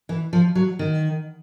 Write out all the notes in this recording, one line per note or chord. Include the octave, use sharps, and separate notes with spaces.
E3
F3
F#3
D#3